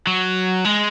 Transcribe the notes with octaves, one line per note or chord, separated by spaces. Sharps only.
F#3
G#3